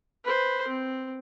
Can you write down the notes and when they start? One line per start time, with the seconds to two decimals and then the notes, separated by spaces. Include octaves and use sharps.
0.24 B4 C5
0.67 C4